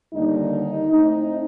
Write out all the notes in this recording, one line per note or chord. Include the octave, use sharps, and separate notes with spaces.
D#2 D3 G3 A#3 D#4
A2 A3 C4 D#4